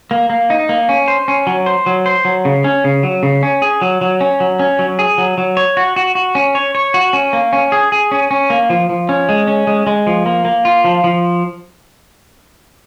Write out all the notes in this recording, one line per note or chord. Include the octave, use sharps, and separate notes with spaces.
A#3
A#3
D#4
A#3
C#4
C5
C#4
F#3
C5
F#3
C5
F#3
C#3
C#4
C#3
F#3
C#3
C#4
G#4
F#3
F#3
C#4
F#3
C#4
F#3
G#4
F#3
F#3
C#5
F#4
F#4
F#4
C#4
C#5
C#5
F#4
C#4
A#3
C#4
G#4
G#4
C#4
C#4
A#3
F3
F3
C#4
G#3
C#4
G#3
G#3
F3
A#3
A#3
F4
F3
F3